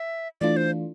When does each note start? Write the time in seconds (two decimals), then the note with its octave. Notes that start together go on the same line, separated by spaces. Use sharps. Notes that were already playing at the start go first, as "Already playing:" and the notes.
Already playing: E5
0.41 E3 A3 D4 F4 D5
0.57 C5